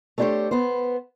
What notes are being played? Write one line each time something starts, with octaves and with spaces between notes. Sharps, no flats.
A3 B3 D4 G4 C5 C#5
B3 C5